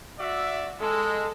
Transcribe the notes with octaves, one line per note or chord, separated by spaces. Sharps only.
F#4 D5 E5
G#3 A4